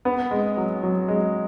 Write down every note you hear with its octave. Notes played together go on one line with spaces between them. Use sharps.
B3
G#3
F#3
F#3
G#3